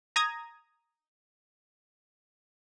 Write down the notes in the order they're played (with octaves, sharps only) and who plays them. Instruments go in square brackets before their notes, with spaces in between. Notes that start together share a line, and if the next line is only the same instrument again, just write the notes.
[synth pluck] A#5 D#6 G#6 A#6